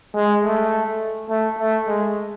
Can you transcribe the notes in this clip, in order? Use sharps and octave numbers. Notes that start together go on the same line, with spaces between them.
G#3
A3
A3
A3
G#3